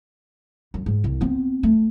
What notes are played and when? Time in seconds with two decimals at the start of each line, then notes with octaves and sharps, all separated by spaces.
0.74 F#2
0.86 G#2
1.04 C2
1.21 B3 C4
1.63 A3